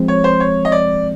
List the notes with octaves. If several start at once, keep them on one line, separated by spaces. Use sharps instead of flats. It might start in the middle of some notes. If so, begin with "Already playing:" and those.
Already playing: F3 G#3 C4
C#5
C5
C#5
D#5
D5